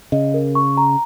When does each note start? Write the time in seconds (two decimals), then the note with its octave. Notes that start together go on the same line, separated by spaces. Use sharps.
0.12 C#3 D#5
0.34 A#4
0.55 C#6
0.77 A#5